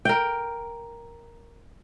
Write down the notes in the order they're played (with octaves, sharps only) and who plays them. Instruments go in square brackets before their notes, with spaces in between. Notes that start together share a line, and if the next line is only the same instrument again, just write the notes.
[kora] A#4 G5